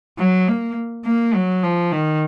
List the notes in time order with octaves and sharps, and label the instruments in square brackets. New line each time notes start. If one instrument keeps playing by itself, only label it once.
[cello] F#3
A#3
A#3
F#3
F3
D#3